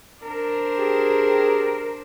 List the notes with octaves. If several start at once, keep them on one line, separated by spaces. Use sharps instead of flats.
D4 A#4 C5
G4 G#4